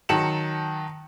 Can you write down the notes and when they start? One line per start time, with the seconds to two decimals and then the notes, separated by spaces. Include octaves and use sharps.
0.09 D#3 F#3 A5 C#7 E7 F#7